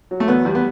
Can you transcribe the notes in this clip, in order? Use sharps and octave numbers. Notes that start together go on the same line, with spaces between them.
F#3
A3
E2 B3
E2 G3
B3